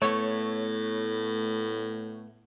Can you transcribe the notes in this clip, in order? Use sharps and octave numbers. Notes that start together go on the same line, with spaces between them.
A2 A3 B3 C#5